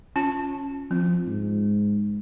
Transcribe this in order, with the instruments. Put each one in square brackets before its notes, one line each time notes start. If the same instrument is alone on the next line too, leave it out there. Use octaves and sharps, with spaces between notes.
[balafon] C#4 F4 A5
[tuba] F3 [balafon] C4
[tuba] G#2